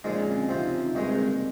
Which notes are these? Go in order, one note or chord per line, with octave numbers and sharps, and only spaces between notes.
A#2 F3 G#3 D#4
C#4
C4
C#4
C3 F3 C4 F4
D#4
D#4
G2 D#3 G#3 C4
C4
A#3
A#3